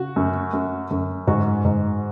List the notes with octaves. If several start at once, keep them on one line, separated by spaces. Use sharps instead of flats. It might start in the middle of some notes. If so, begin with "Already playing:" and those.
Already playing: C#3 F#4
F#2
F#2
F#2
G#2 F#4
G#2